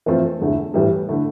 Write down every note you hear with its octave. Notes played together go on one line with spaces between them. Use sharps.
F2 E3 A3 C4 F4
E1 E2 D3 A3 E4
A2 E3 G3
D3 A3 E4